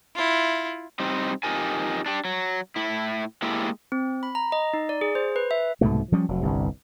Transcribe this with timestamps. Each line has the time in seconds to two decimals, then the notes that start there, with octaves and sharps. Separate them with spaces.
0.15 E4 F4
1.00 G3 C4 D#4
1.43 F2 B2 D#4 G4 A#4 G#5
2.06 D4 G4
2.25 F#3
2.76 A2 E4
3.42 G#3 A#3 E4 G4
3.92 C4
4.23 B5
4.35 A#5
4.52 D#5
4.73 D#4
4.89 D5
5.01 G#4
5.15 C5
5.36 B4
5.51 E5
5.81 C2 G#2 B2 A3
6.12 F3 G3 C#4
6.29 F1 F#3
6.41 G1 C2 G2